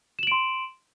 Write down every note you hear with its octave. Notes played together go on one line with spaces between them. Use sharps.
C6 D7 E7 F#7